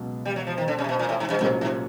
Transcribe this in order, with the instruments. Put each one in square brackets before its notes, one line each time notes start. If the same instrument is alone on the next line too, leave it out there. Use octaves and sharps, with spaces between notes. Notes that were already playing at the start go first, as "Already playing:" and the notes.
Already playing: [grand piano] C#2 B2 F#3
[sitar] G3
F#3
F3
D#3
D3
C#3
C3
B2
A#2
A2
G#2
G2
[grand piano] C2 A#2 F#3 A#3 C#4 [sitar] G2
[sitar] G#2